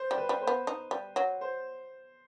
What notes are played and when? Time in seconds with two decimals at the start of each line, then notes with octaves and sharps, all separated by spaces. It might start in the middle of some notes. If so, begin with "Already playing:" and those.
Already playing: C5
0.11 G3
0.17 B4
0.29 G3
0.41 C5
0.47 B3
0.67 D#4
0.91 G3
1.16 F#3
1.41 C5